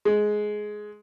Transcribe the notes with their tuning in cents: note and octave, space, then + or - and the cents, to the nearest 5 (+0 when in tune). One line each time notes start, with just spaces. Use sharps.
G#3 +10